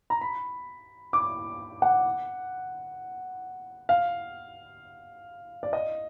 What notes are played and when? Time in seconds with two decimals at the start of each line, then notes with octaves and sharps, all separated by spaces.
0.10 A#5
0.21 B5
1.13 D6
1.82 F#5
3.89 F5
5.63 D5
5.73 D#5